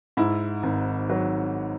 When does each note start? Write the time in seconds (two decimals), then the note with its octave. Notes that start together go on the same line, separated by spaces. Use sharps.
0.17 G#2 E4
0.63 G#1
1.09 F#3